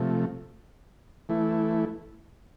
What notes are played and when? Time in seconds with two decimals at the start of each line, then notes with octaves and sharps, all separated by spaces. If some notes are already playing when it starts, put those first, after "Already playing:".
Already playing: C3 F3 A3
1.29 E3 A3 E4